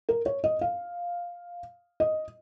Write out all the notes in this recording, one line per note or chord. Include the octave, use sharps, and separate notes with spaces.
A#4
C#5
D#5
F5
D#5